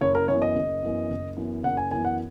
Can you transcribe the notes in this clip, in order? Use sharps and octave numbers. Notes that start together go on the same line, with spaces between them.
F#1 C#5
A#4
F#2 E3 B3 C#5
D#5
F#1
F#2 E3 B3
F#1
F#2 E3 B3
F#1 F#5
G#5
F#2 E3 B3 G#5
F#5